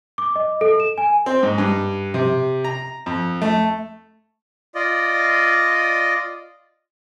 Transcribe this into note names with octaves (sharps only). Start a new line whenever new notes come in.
D6
D#5
A4
E7
G#5
C4
G#2
G2
C3
A#5
F2
A3
F4 D5 D#5